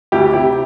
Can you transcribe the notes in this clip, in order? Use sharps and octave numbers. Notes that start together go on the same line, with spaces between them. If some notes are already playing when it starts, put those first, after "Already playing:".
D2 E4 G4
C3 E4 G4